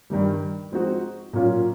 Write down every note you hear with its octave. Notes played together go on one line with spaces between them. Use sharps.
G2 D#3 G3
F3 G#3 C4 D#4 F#4
A#2 F#3 A#3 C#4 F4